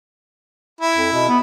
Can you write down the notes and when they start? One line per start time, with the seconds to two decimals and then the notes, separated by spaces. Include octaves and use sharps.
0.81 E4
0.96 F2
1.12 B2
1.28 B3